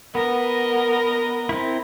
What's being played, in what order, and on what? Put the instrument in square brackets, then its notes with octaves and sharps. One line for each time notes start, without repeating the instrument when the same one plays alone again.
[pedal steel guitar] B3 [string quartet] A#4 D#5 A#5
[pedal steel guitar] C4 E4